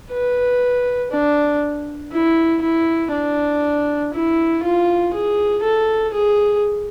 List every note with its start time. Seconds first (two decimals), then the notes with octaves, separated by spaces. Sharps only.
0.11 B4
1.11 D4
2.12 E4
2.62 E4
3.12 D4
4.13 E4
4.63 F4
5.13 G#4
5.64 A4
6.13 G#4